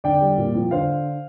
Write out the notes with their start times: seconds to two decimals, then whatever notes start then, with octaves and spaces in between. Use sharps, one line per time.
0.04 D3 D5 G5
0.21 G3
0.37 A#2
0.55 F3
0.71 D3 C5 F5